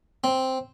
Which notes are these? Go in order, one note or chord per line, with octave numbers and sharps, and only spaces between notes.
C4